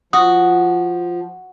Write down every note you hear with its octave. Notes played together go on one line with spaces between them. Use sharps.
F3 F#4 D#6